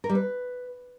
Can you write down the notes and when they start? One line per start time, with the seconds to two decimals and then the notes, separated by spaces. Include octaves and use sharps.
0.04 A#4
0.09 G3
0.15 B4